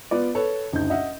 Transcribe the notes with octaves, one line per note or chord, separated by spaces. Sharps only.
B3 F4 D5
A4 B4 C#5
F#1 D2 D#4 G6
D#5 E5 F#5